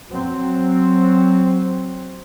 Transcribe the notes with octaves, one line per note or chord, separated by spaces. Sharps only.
F#3 C4